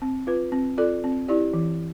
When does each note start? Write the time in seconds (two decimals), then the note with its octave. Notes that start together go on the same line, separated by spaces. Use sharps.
0.02 C4
0.27 F4 B4
0.52 C4
0.78 F4 A4 D5
1.04 C4
1.28 E4 G4 D5
1.54 E3